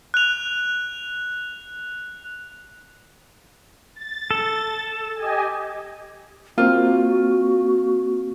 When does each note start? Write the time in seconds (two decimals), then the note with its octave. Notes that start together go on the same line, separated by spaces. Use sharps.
0.14 F#6 F7
3.95 A6
4.31 A4
5.15 G4 D#5 G#5
6.58 A#3 C4 F4 F#4